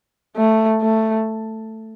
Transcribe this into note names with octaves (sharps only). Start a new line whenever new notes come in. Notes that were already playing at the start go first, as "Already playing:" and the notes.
A3
A3